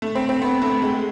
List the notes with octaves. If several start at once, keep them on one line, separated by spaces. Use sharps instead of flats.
A3
C4
C4
B3
A3
G#3